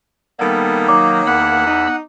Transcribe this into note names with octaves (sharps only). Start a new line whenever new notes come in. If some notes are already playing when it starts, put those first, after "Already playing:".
D#3 G3 A#3 B3 A4
F#3 D#4 D6
E2 F#5 B5 E6
D#4